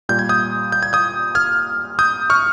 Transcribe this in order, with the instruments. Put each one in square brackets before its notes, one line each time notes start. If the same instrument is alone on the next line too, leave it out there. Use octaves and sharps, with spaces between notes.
[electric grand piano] A#2 G3 G6
G#6
D#6 G6
G6
G#6
D#6 G6
F6 G#6
D#6 G6
C#6 F6